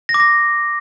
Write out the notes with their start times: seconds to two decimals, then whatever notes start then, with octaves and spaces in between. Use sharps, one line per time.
0.09 A#6
0.14 D6
0.20 A#6